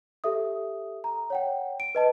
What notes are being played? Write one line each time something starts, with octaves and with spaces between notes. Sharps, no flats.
G4 A4 E5 D#6
A#5
C#5 F#5 G5
D7
B4 D#5 A5